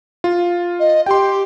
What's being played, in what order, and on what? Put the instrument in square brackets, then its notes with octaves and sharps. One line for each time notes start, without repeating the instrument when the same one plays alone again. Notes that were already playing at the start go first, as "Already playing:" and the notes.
[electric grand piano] F4
[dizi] D#5
[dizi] G4 [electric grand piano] G5 C6